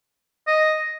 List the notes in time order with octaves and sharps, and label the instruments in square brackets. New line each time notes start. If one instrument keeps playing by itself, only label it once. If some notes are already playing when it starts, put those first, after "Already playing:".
[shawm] D#5